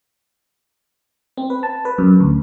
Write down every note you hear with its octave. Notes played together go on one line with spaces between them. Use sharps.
C4
B4
A5
B4
F#2
D2